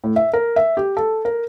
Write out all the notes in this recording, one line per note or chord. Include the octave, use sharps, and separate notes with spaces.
A2
E5
A#4
E5
G4
A4
A#4